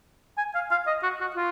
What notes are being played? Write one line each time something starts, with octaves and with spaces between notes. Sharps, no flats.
G#5
F5
F5
D#5
F#4
F#4
F4